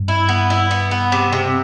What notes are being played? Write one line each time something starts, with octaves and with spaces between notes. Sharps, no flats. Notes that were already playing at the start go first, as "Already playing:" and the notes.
Already playing: G2
E4
B3
E4
B3
B3
C3
C3